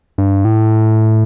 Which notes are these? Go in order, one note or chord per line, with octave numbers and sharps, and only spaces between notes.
G2
A2